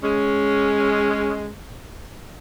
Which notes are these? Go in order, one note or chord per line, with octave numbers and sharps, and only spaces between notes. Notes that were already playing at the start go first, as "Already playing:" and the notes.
G#3 C#4